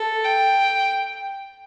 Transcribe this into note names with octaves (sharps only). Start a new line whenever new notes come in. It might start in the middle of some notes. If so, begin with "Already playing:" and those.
Already playing: A4
G5